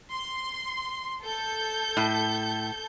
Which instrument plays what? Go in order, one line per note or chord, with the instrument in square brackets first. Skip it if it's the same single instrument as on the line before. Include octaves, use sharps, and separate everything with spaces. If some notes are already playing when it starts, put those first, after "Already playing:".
[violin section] C6
A4 G6
[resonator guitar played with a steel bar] A2